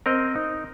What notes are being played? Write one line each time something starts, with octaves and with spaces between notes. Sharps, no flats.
C4 A#4 D#5
D#4